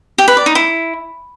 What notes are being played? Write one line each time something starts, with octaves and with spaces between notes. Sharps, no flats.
G4
B4
D5
D#4
E4